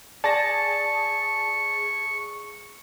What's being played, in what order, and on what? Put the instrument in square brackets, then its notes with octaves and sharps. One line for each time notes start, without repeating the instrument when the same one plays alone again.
[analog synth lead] G#4 [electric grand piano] D5 G#5 A#6 [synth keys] A5 [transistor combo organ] C#6